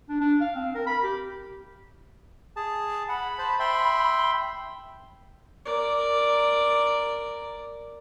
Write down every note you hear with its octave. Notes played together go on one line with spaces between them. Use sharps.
D4
D4
F5
C4
A#4
B5
G4
G#4 A5
F#5 B5
C5 A5
E5 G5 C6
A#4 D5